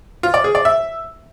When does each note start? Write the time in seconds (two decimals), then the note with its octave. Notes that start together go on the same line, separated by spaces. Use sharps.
0.23 F4
0.34 D5
0.44 G#4
0.55 D5
0.65 E5